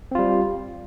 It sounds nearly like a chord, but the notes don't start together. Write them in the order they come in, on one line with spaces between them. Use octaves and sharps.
C4 F4 G3